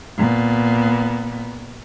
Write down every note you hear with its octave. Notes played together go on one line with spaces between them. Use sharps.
A#2 B3